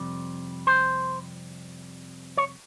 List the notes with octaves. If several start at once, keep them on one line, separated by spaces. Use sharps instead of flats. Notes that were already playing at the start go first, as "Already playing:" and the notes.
Already playing: F2 C3 G3
C5
C#5